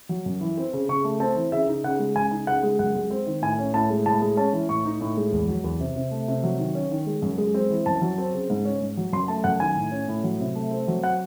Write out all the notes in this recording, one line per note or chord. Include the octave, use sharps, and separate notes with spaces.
F#3
F#2
E3
C4
C#3
C#3 C#6
A3
C4 A5
E3
C#3 E5
D#4
C#3 F#5
G#3
C#3 G#5
D#4
C#3 F#5
G#3
F#2 F#5
G#3
C4
D#3
A2 G#5
C#4
A2 A5
G#3
A2 A5
G#3
C#4 A5
E3
A2 C#6
D#4
A2
G#3
E2
F#3
E2
C3
C3
A3
C3
F#3
D#3
C#4
D#3
G#3
F#2
G#3
C4
E3
F#2 A5
F#3
C4
C#3
G#2
C#4
G#2
F#3
F#2 C6
A3 A5
F#2 F#5
D#3 G#5
A2
C#4
A2
F#3
C3
A3
C4
F#3
F#5